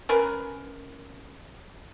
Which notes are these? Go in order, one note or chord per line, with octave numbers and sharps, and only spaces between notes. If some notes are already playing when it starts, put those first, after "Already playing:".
C#4 A#4 B4